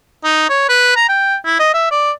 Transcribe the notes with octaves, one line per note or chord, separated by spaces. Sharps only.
D#4
C#5
B4
A#5
G5
E4
D#5
E5
D5